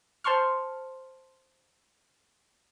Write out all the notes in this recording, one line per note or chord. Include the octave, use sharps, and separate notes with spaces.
C5 A5 C6 C#6 F6